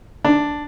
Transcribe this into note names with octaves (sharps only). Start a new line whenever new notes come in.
D4